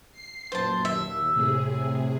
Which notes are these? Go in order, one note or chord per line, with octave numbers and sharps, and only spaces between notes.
C7
F#2 A#2 C5 A5
D#2 E5
A2 C3 G#4